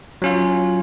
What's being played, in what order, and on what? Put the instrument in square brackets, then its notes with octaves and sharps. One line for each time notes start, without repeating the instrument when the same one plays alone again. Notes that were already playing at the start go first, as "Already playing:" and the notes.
[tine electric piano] F#3 C#4 F4